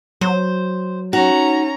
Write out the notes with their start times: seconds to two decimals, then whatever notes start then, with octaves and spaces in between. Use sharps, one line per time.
0.21 F#3 C5
1.13 C#4 D#4 F#4 A#5